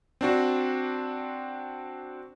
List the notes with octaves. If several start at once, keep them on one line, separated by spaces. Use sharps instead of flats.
C4 D4 F#4